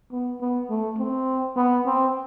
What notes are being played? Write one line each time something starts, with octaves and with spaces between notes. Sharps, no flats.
B3
B3
A3
C4
B3
C4